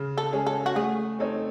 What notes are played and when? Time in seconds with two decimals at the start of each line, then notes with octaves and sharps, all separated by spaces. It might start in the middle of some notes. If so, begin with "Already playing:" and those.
Already playing: C#3
0.18 A4
0.32 G#3 C#4 G#4
0.47 A4
0.66 F#4
0.76 A3 G#4
1.19 C4 D#4 A4 C#5